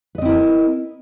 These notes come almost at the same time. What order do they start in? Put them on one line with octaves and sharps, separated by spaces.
B4 D#5 C4 E4 A#4